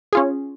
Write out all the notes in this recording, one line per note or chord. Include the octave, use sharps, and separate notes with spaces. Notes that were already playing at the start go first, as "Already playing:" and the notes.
C#4 F4 G#4